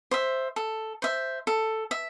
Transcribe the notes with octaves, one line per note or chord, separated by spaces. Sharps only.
C5 E5
A4
C5 E5
A4
E5